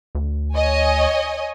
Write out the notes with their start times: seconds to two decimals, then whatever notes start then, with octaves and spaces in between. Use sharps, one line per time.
0.15 D2
0.54 C#5 D#5 G#5